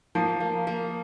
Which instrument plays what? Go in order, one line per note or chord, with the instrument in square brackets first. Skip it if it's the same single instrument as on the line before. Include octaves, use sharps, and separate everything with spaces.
[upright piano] F3 [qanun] A#3
[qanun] A#3
A#3